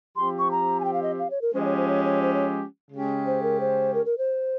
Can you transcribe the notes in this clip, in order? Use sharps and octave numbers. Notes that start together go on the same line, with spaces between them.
F3 C4 G4 C6
C#6
A#5
G#5
G5
F5
D#5
F5
C#5
A#4
F3 G#3 C#4 G4 C5
D#5
C#5
C5
C#5
C#5
C5
C#5
C#3 G#3 C#4 G4
C5
A#4
C5
A#4
A#4
C5